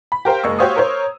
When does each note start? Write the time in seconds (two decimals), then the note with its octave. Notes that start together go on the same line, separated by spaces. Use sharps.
0.12 B5
0.25 G4 A#4 C5 F5 G5
0.43 F#1 G#3 A#3 C#6 E6
0.59 F#4 G4 C5 C#5 F5 D#6
0.76 A#4 C5 C#5